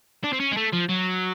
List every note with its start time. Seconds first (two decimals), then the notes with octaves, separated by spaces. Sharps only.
0.24 D4
0.33 C4
0.40 C#4
0.51 G#3
0.57 A3
0.73 F3
0.89 F#3